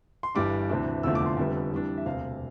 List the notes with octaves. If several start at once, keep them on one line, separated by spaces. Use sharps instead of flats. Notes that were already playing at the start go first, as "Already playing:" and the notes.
C6
G1 G2 E3 G3 D4 D6
D2 C3 E3 A3 D4
F1 E2 D3 F3 A3 E6
D6
C6
F1 F2 D3 G3 B3 E5
F2 E3 G3 D4
E5
E1 D2 C3 F5